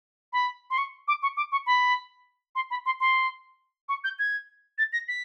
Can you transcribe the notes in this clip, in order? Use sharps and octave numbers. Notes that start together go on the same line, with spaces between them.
B5
C6
C#6
D6
C#6
D6
C#6
B5
C6
B5
C6
C6
C#6
G6
G#6
A6
A#6
B6